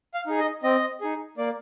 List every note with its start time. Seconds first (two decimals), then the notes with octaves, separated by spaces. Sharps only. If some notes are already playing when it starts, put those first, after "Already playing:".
0.14 F5
0.26 D#4 G#4
0.39 D#5
0.63 C4 D#5
1.01 D#4 G#4
1.37 A#3 D5